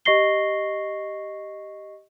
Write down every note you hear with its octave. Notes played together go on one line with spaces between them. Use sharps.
G4 D#5 C#6 A#6 C7 G7